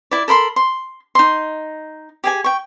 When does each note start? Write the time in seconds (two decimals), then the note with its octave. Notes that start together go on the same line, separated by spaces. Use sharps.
0.11 E4 D5
0.28 A4 A#4 B5 C6
0.56 C6
1.15 D#4 C6
2.24 G4 G#4 G#5
2.44 G5 C#6